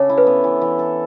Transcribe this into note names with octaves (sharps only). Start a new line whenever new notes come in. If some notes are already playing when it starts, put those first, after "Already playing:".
Already playing: C#3 D4 A4 C#5
E4
B4
B3
E3
E3
A4